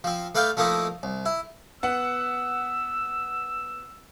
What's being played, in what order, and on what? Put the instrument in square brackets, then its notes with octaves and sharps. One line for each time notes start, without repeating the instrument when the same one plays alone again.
[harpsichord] F3 C4
A3 B4 D5 F5 G5
F3 A3 A#3 D#4 E4
C2
E4
[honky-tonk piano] B3 F#5 [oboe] E6